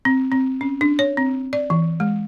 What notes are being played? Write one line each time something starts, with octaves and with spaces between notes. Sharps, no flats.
C4
C4
C#4
D4
C#5
C4
D5
E3
G#3